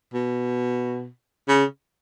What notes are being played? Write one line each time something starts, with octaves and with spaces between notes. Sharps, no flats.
B2
C#3